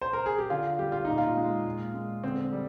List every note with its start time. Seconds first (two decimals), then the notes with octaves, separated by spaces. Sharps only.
0.01 C5
0.13 A#4
0.26 G#4
0.38 G4
0.50 D3 F4
0.79 G3 G4
0.92 F4
1.05 A#2 D#4
1.18 F4
1.37 G#3
1.65 A#2
1.94 G#3
2.23 D3 C4
2.53 G3